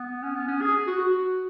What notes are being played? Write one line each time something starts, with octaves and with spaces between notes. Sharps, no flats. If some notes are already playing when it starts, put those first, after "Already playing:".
Already playing: B3
C#4
B3
C#4
G#4
F#4
F#4